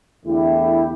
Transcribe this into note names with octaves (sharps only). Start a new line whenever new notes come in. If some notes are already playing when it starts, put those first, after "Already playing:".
E2 D3 A3 E4 G4